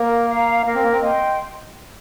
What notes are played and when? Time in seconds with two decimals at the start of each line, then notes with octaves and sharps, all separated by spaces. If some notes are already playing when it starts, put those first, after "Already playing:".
Already playing: A#3 A#4
0.29 F5 A#5
0.66 A#3 A#4
0.74 C4
0.84 A#3
0.92 C4
1.02 A#3 D#5 G5 C6